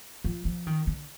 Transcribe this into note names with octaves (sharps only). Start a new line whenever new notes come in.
F3
F3
D#3
D3